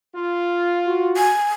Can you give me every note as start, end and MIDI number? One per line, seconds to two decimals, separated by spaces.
0.14 1.17 65
0.87 1.31 66
1.17 1.50 80